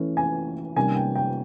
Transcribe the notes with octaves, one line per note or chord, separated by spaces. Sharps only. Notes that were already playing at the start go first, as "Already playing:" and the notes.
Already playing: E3 A3 C#4
G#5
C3 D#3 G3 A#3 C#4 G#5
G5
G5